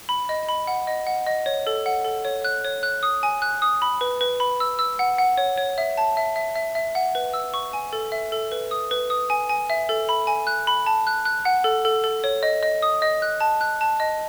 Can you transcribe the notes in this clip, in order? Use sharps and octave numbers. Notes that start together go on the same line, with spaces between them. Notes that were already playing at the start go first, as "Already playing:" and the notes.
B5
D#5
B5
F#5
D#5
F#5
D#5
C#5
A4
F#5
A4
C#5
F#6
C#5
F#6
D#6
G#5
F#6
D#6
B5
B4
B4
B5
E6
E6
F#5
F#5
C#5
C#5
E5
A5
E5
E5
E5
E5
F#5
B4
E6
C#6
G#5
A4
E5
A4
B4
D#6
B4
D#6
G#5
G#5
E5
A4
B5
G#5
F#6
B5
A5
F#6
F#6
F#5
A4
A4
A4
C#5
D#5
D#5
D#6
D#5
F#6
A5
F#6
A5
D#5